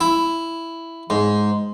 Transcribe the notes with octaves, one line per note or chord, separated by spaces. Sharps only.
E4
G#2